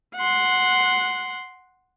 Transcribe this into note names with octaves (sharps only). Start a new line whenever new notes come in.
F#5 C6